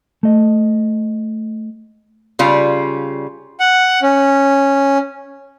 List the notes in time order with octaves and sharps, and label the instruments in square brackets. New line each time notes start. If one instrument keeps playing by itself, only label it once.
[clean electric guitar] A3 D#5
[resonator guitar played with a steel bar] C#3 G3 F4
[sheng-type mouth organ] F#5
C#4